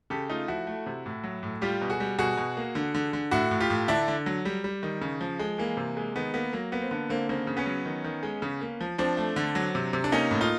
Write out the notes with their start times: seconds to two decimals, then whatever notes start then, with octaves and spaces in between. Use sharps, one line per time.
0.10 C#3 G4 A4
0.30 A3 D#4 F4
0.48 F3 E4 F#4
0.67 A3
0.86 C3
1.06 A2
1.24 F#3
1.43 A2
1.61 G3 F4 G4
1.81 B2
1.90 F#4 G#4
2.00 G3
2.19 B2 F#4 G#4
2.37 B2
2.57 A#3
2.75 D3
2.94 D3
3.13 D3
3.31 A2 E4 F#4
3.51 A2
3.60 F4 G4
3.70 A2
3.88 D3 D4 E4
4.08 D3
4.26 F#3
4.45 G3
4.64 G3
4.83 D#3
5.01 C#3
5.21 F3
5.39 G#3
5.58 E3 A#3
5.77 C3
5.97 G#3
6.16 D#3 B3
6.34 A#3 B3
6.53 F#3 A#3
6.72 A#3 B3
6.82 C4
6.91 D3 B3
7.09 D3 A#3 C4
7.29 C#3 A#3 C4
7.47 C#3
7.57 B3 C#4
7.66 F#3
7.85 D#3
8.04 D#3
8.23 G#3
8.42 C#3
8.61 A#3
8.81 F3
8.98 F3 C4 D4
9.17 A3
9.36 D3
9.55 F#3
9.75 C3
9.93 C3
10.04 D4
10.12 A#3 C#4 D#4
10.31 A2
10.41 D#4 F4